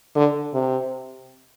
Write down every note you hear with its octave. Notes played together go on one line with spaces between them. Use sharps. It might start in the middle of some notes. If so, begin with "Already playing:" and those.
D3
C3